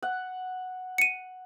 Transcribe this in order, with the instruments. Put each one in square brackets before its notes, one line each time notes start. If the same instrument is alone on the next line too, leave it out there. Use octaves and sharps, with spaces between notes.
[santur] F#5
[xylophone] C#7 D#7